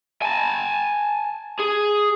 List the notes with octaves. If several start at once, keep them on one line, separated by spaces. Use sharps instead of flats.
G#5 A5
G#4